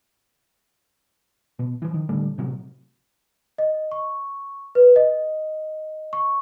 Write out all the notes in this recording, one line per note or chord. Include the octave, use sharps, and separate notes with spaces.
B2
E3 F3
D#3
A2 D3 G3 A3
A2 C3 F#3
D#5
C#6
B4
D#5
C#6